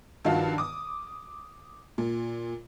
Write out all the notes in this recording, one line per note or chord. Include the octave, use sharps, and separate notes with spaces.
G2 D#3 F3 F#4 F5 A5
D6 D#6
A#2